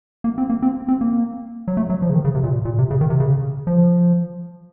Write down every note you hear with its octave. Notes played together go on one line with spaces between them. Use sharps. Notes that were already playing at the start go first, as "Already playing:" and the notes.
A#3
C4
A#3
C4
C4
A#3
F#3
A3
F#3
F3
C#3
D#3
C#3
C3
A#2
A#2
C3
C#3
D#3
C3
C#3
F3